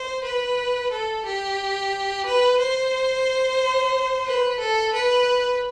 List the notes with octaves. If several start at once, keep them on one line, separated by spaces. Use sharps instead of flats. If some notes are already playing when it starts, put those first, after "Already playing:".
Already playing: C5
B4
A4
G4
B4
C5
B4
A4
B4